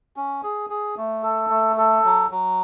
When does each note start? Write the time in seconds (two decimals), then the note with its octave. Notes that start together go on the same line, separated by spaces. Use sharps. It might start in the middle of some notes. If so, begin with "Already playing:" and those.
0.16 C#4
0.43 G#4
0.70 G#4
0.97 A3
1.23 A4
1.50 A3
1.77 A4
2.04 F#3
2.31 F#3